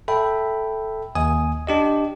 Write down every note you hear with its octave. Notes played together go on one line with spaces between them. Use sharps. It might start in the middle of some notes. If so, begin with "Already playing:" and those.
A4 E5 G5 B5
D#2 G#5 D#6
D4 G4 D#5